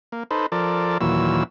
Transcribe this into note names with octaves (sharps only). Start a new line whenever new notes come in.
A#3
D#4 A4 B4 C5
F3 A4 A#4 D5
D#2 A#2 E3 F#3 E6